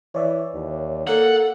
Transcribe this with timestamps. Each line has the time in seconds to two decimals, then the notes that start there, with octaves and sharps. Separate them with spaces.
0.15 E3 C#5 D5 E5
0.54 D#2
1.07 A#3 A4 F#5